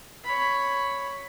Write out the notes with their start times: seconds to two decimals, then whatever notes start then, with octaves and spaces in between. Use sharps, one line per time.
0.24 C#5 B5